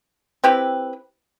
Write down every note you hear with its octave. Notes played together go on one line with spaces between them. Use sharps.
C4 E4 G4 B4